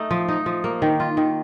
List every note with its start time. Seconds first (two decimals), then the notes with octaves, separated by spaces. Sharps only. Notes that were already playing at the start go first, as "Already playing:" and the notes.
Already playing: A3 D#4
0.11 F3
0.28 D#4
0.46 F3
0.64 A#3
0.82 D#3
1.00 F4
1.17 D#3